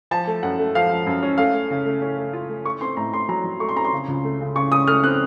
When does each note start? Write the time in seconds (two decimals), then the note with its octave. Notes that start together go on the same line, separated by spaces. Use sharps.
0.11 F3 A5
0.27 A3
0.43 F#2 F#5
0.59 A3
0.75 F3 F5
0.91 F3
1.06 F#2
1.23 C#4
1.38 A3 F5
1.54 A3
1.71 C#3
1.86 A3
2.02 C#4
2.17 A3
2.33 F4
2.49 A3
2.65 A3 C#6
2.81 C4 C6
2.97 A2 A#5
3.13 A2 C6
3.29 F#3 A#5
3.44 F#3
3.60 A3 C#6
3.69 C6
3.76 C4 A#5
3.84 C6
3.93 C#3
4.08 C#2
4.24 A3
4.40 C#3
4.56 C#3 C#6
4.72 C#3 D#6
4.87 A3 F6
5.04 C4 F#6